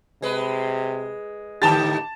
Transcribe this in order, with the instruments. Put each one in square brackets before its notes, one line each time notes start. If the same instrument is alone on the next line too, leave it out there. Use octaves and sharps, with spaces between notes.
[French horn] C3 [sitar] G#3 B4
[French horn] A2 [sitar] D3 D#3 G4 [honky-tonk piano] A5 A6